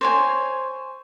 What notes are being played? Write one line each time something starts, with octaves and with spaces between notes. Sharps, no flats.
C5 C#5 G#5